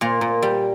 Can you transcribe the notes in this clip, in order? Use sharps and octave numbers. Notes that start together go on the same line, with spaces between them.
A#2 A#3
A#2
G3